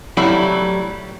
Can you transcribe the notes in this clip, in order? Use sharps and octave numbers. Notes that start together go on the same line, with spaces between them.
A2 F#3 G3 E4 F5